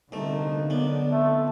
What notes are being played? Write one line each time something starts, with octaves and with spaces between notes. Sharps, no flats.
C2 B2 D3 A3 A#3 D#4
B1 B3 D5
A3 C4 F4